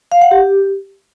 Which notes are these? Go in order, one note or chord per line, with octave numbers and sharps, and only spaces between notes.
F5
F#5
G4